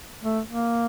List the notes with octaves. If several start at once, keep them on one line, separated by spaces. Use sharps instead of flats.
A3
A#3